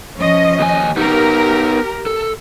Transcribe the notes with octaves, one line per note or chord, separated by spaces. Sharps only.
F3 C#4 D#5
D#2 G#5
B3 D#4 G4 A#4
A4